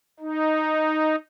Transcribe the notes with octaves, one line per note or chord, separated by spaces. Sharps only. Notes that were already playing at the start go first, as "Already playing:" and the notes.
D#4